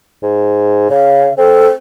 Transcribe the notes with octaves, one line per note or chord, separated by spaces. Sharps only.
G#2
C#3 F5
C4 A4